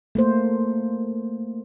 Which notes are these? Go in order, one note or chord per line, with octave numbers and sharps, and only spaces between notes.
A3 A#3 C5